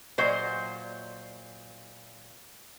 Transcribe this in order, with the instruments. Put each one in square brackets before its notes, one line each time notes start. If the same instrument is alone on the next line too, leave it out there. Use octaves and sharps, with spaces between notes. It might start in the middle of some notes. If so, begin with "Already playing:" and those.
[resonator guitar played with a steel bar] A#2 F#3 C5 D#5